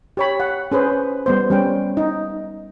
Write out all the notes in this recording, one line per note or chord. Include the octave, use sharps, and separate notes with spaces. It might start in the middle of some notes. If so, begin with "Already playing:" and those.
G4 C#5 B5
F#5
C#4 G#4 B4 C5
G3 B3 C5
G3 C#4 G5
D#4